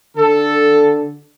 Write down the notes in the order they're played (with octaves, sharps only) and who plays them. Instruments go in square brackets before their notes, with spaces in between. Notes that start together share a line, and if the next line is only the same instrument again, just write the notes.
[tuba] D3 [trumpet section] A4